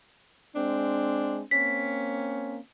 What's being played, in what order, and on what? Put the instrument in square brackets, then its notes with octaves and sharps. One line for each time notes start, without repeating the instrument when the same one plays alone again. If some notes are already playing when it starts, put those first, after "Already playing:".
[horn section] G#3 C4 D4
[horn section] A#3 C4 C#4 [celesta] B6